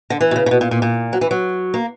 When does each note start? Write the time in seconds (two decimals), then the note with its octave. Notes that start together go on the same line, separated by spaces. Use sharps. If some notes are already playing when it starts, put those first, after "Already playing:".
0.10 D3
0.21 E3
0.31 B2
0.36 C#3
0.46 C#3
0.51 B2
0.61 A#2
0.71 A#2
0.82 A#2
1.13 F#3
1.21 E3
1.31 F#3
1.74 A#3